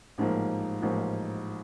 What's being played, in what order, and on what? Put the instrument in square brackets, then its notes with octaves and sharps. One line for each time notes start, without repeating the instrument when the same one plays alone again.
[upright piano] A1 G#2 F3 A#3
A1 G#2 F3 A#3